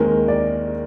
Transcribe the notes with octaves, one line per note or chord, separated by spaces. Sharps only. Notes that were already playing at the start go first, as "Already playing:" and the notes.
Already playing: D#2 D#3 G#3 C4 A#4
D5